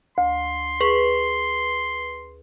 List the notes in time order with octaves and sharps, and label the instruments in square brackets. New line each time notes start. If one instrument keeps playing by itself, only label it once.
[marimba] D2 [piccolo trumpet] C6
[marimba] G#4 C#6 [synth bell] B4